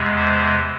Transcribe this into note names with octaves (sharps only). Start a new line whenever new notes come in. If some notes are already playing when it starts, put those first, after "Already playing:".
Already playing: E2 C3 G#3
C5